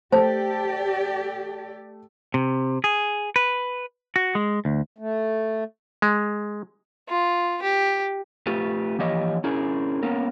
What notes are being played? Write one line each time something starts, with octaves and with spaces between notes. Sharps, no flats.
A3 G4 C5 D5 A5
C3
G#4
B4
F#4
G#3
D2
A3
G#3
F4
G4
A3 F4 G4 B4
E3 F3 A#3 G4 C#5 D#5
C#4 D#4 E4 G#4 A#4
A#3 B3 C#4 A#4